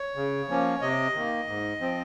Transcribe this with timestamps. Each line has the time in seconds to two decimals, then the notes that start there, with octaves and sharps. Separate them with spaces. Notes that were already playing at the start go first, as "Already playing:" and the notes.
Already playing: C#5
0.16 C#3
0.48 F3 A#3 C#4
0.81 C3 D#5
1.15 D#3 A#3
1.47 G#2
1.80 F3 C4